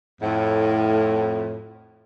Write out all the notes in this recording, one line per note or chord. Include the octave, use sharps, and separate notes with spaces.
F2 A2